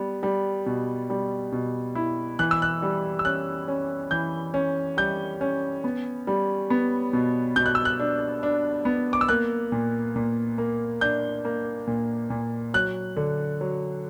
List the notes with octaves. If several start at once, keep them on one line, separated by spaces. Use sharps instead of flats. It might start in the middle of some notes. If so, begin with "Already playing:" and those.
Already playing: G3 B3
G3
B2
G3
B2
E4
E3 F#6
E6
F#6
G3
E6
C#4 F#6
C#4
E3 G6
C#4
G3 G6
C#4
B3
G3
B3
B2
B2 G6
F#6
E6
F#6
D4
D4
B3
D6
E6
A#3 F#6
A#2
A#2
A#3
D4 G6
A#3
A#2
A#2
F#3 F#6
D3
F#3